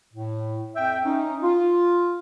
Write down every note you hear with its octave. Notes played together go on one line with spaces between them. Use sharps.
A2
F2 E5 G5
C#4 D#4
F4